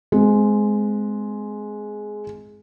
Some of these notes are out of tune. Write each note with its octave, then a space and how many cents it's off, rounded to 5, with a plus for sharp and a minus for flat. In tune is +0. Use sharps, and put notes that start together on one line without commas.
G#3 +10 C4 -20